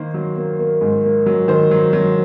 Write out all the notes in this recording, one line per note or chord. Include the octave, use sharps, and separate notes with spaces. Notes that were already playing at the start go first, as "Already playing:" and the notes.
Already playing: D#3 A#3 C5
F#3
A#3
A#3
G#2
A#3
F#3
D#3 C5
F#3
F#3